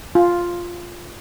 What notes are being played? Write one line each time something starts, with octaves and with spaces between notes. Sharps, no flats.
F4